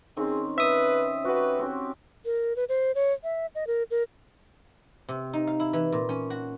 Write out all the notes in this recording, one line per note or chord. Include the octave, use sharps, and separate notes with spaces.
D#3 C4 C#4 G#4
B4 E5 D#6
F#4 G4 B4 G#5
C4 C#4 G4
A#4
B4
C5
C#5
E5
D#5
A#4
A#4
C3
D#4
F5
E4
E3
A#2
C#4
F#4